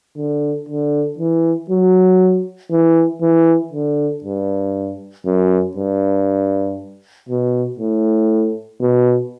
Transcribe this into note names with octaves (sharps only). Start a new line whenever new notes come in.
D3
D3
E3
F#3
E3
E3
D3
G2
F#2
G2
B2
A2
B2